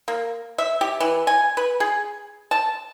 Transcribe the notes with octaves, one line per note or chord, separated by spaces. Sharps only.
A#3
E5
G4
E3
G#5
B4
G#4
A5